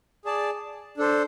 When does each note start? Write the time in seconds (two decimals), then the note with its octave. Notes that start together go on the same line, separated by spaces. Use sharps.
0.25 G#4 D5 A5
0.97 D4 A4 C5